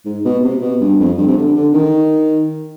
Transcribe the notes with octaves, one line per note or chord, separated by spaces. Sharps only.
G#2
B2
C3
B2
G2
F2
G2
C3
D3
D3
D#3